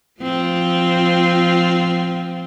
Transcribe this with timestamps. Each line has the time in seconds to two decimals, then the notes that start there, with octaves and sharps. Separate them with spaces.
0.20 F3 C4 F4